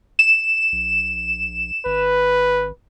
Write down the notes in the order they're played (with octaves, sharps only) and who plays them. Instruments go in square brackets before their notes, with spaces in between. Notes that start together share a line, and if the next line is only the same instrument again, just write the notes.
[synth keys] E7
[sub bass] A#1
[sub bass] G#1 [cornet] B4